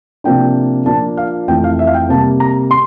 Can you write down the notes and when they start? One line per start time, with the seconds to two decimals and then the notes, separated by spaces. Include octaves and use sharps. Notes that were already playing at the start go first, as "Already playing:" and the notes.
0.24 C3 F3 A#3 D4 G5
0.86 A#2 F3 A#3 D4 A5
1.17 F5
1.48 F2 E3 A3 G5
1.64 F5
1.79 E5
1.87 F5
1.94 G5
2.09 C3 G3 A#3 A5
2.40 A#5
2.71 C6